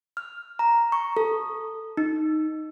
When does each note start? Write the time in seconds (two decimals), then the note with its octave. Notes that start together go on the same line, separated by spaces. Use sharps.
0.17 F6
0.59 A#5
0.92 C#6
1.17 A4
1.97 D#4